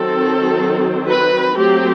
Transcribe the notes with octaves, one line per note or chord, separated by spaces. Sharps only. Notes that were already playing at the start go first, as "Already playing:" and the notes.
Already playing: D#3 F#3 C4 A4
B4
F#3 A3 C4 G4